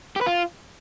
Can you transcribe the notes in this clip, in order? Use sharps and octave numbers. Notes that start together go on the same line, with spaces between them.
G4
B4
F4